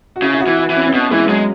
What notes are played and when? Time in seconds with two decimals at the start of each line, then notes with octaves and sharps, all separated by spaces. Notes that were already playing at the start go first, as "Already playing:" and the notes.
0.16 F#4
0.22 C#3 E4
0.33 E4
0.41 F#4
0.47 E3
0.58 E4
0.70 E3
0.76 C#4
0.87 C#4
0.93 B2 B3
1.11 E3 G#3
1.28 F#3 G#3